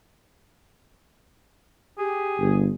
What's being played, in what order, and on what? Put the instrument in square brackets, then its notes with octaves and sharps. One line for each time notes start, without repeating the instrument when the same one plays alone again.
[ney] G4 [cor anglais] G#4
[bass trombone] G1